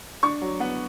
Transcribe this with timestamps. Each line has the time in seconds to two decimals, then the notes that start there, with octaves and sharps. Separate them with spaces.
0.23 D4 C#6
0.41 F#3
0.60 B3